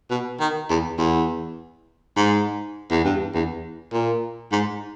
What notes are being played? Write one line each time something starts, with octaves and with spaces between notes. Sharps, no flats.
B2
D#3
E2
E2
G#2
E2
G2
E2
A#2
G#2